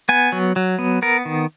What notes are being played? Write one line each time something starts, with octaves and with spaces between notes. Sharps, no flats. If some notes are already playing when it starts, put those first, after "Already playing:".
B3 G#5
F#3
F#3
B3
B3 A#4
D#3